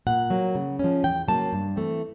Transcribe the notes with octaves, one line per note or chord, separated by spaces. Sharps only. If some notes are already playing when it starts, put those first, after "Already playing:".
A#2 F#5
F#3 A#3
C#3
F3 G#3 C#4
E2 G5
C#3 F#3 A#3 A5
G2
E3 A3 C4